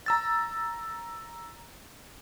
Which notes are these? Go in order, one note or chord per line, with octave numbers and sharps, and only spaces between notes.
A#5 E6 A6